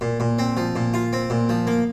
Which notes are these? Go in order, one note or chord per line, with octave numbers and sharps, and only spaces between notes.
A#2
A#2
C4
F3
A#2
F4
C4
A#2
F3
A#3